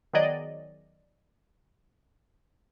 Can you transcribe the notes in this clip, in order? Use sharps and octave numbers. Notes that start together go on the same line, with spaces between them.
D#3 F#3 B3 G#4 D5 D#5